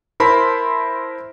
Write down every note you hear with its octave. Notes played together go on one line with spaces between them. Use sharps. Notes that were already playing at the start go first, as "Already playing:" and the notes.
E4 A#4 C5 A5 B5 C6